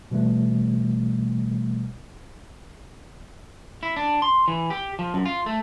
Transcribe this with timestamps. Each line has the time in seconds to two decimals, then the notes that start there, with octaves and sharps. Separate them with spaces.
0.11 B2 E3 G3 A3
3.83 E4
3.96 D4
4.22 C6
4.48 E3
4.70 G4
4.99 F3
5.14 F#2
5.26 F4
5.46 A3